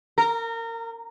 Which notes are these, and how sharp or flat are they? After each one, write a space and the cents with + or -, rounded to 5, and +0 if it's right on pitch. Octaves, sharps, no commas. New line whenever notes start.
A#4 -25